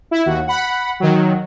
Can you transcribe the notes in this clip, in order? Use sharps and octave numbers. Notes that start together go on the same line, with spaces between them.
E4
D#2 F#4
F#5 B5
D#3 F#3